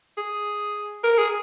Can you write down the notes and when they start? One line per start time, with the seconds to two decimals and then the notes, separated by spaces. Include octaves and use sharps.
0.17 G#4
1.04 A#4
1.18 G#4